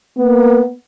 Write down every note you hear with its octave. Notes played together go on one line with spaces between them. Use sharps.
A#3 B3